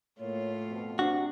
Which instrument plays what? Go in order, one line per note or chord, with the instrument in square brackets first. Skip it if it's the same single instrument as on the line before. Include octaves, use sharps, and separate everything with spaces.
[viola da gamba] A2 F4 [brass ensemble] A#3 C#5
[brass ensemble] F2 B2
[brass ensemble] C3 [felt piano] D4 [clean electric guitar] F#4